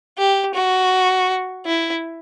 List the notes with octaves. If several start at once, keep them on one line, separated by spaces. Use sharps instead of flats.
G4
F#4
E4